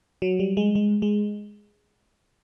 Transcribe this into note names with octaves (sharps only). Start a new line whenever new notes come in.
F#3
G3
G#3
G#3
G#3